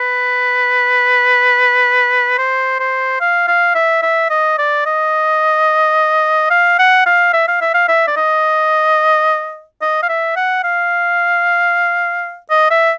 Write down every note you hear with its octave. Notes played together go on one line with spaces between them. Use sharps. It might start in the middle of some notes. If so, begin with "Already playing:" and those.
Already playing: B4
C5
C5
F5
F5
E5
E5
D#5
D5
D#5
F5
F#5
F5
E5
F5
E5
F5
E5
D5
D#5
D#5
F5
E5
F#5
F5
D#5
E5